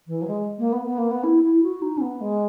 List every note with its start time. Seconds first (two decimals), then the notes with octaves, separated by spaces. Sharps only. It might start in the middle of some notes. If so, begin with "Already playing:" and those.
0.07 E3
0.22 F#3
0.27 G#3
0.59 A#3
0.72 B3
0.85 B3
0.98 A#3
1.11 B3
1.24 E4
1.43 E4
1.63 F#4
1.82 D#4
1.97 C#4
2.01 B3
2.21 G#3